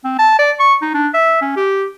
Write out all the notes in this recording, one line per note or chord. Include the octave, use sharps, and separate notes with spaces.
C4
A5
D5
C#6
D#4
D4
E5
C#4
G4